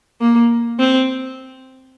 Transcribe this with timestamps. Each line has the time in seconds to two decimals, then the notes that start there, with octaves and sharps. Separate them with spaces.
0.21 A#3
0.79 C4